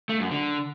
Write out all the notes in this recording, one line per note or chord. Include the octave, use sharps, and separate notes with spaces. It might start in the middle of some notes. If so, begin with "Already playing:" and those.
A3
F#2
D3